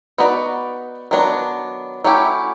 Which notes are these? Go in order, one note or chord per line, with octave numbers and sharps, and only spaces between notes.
B3 D#4 F#4 B4 D5
D#3 F#3 B3 D4
F#3 A3 C#4 E4 G4